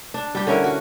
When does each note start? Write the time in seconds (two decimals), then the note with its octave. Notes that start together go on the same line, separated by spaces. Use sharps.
0.14 D4
0.35 G3 G4
0.47 D3 C#4 E4 A#4
0.64 F#4